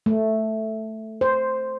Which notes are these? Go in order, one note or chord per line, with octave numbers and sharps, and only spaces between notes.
A3
C5